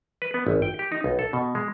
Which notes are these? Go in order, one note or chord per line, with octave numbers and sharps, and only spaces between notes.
B4
B3
G#1
G5
G4
D#4
B1
A4
B2
G#3